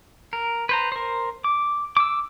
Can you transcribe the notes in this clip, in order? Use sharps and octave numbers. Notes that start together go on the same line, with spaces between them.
A#4
B4 C5 A#5
A#4 C5
D6
D6 E6